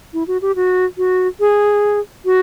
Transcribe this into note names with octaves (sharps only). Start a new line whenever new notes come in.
E4
F#4
G4
F#4
F#4
G#4
F#4